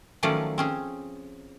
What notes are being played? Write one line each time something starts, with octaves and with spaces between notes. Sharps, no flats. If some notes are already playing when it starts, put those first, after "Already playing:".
D#3 F3 F#3 A3 C#4 D5
C4 C#4 G#4